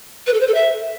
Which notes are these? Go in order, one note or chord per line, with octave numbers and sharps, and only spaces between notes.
B4
A4
C5
A4
E5